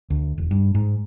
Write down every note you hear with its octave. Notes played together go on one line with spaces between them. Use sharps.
D2
E1
G2
G#2